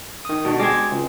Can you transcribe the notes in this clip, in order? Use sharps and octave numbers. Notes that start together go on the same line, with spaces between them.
D#3 D#6
B2 D3
G#3 C4 D6 G#6
C#2